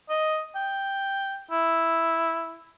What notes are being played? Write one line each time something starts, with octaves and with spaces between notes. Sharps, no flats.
D#5
G5
E4